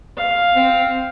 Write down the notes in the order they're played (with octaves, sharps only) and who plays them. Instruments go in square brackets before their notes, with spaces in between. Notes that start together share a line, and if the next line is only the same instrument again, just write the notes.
[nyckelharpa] F5
[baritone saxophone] C4